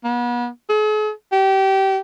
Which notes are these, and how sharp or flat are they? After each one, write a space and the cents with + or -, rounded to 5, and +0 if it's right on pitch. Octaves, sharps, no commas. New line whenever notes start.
B3 -35
G#4 +45
G4 -25